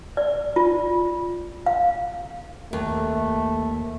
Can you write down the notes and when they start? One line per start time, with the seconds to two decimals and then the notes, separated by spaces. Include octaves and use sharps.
0.17 D5
0.56 F4
1.66 F5
2.73 D#2 A3